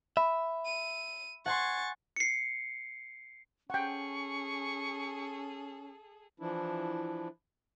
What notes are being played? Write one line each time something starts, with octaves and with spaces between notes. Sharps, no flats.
E5 B5
D#7
F#5 G#5 C6 C#6 A6
C7 C#7
C#4 G#4 A4 F#5 G5 C#6
E3 F3 D4 E4